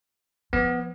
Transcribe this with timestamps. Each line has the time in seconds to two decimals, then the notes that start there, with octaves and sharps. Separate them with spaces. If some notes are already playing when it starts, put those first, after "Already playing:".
0.53 F3 B3